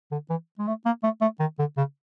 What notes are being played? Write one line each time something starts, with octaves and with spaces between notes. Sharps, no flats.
D3
E3
G#3
A3
A#3
A3
A3
D#3
D3
C#3